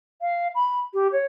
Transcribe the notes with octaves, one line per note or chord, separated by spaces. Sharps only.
F5
B5
G4
C#5